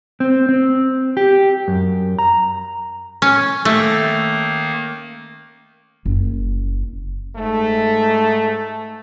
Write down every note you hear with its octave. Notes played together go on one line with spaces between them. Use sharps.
C4
C4
G4
F#2
A#5
C#4
D#3 A3 A#3
F#1
G#2 A3